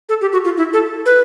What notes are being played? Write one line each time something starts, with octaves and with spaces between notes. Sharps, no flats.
A4
G4
F#4
F4
E4
A4
B4